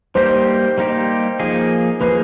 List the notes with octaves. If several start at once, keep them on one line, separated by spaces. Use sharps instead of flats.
G3 A#3 D#4 G4 C5
G3 A#3 D#4 G4
F3 A#3 D#4 G#4
F3 A#3 D#4 G#4 B4